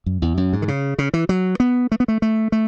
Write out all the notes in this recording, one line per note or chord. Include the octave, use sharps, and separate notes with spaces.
F#2
E2
F#2
G#2
D#3
C#3
C#3
E3
F#3
B3
A3
B3
A3
A3
A3